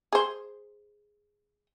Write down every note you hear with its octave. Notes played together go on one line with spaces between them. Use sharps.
G#4 C5